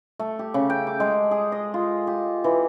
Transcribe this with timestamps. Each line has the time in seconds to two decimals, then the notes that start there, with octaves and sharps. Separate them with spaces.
0.19 A3
0.39 G4
0.54 C#3
0.70 G5
0.87 D6
1.00 G#3
1.31 G#4
1.52 D#5
1.74 F4
2.07 G4
2.44 E3